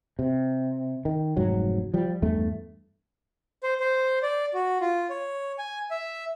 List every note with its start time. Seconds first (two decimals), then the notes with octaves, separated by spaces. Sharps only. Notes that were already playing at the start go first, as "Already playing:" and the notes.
0.19 C3
1.05 D#3
1.37 F1 G#2 F#3
1.94 F3 G3
2.22 E2 G2 A3
3.63 C5
3.80 C5
4.23 D5
4.54 F#4
4.81 F4
5.10 C#5
5.59 G#5
5.91 E5